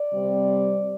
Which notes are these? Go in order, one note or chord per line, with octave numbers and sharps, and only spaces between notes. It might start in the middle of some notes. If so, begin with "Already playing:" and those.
Already playing: D5
C3 G3 C4